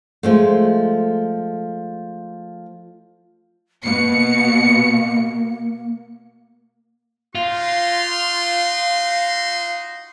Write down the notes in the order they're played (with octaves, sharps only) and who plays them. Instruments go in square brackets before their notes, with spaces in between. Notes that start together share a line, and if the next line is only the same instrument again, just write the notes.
[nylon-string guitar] F3 G#3 A3
[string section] B2 C#7 [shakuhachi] A#3
[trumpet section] D#4 F#4 C6 [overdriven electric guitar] F4